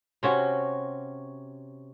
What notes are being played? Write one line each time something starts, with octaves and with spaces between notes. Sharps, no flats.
C3 C#4 F#4